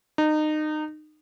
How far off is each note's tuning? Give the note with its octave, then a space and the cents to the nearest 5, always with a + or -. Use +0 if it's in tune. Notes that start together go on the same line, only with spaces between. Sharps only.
D#4 -25